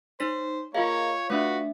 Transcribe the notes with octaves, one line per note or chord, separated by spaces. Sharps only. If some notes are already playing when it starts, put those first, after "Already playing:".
D#4 C5 C#5 B6
A#3 F4 G#4 C#5 D#5 F5
A3 D4 F#4 B4 E5